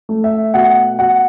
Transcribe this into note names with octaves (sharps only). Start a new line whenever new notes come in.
A3
E5
B2 F#5
B2 F#5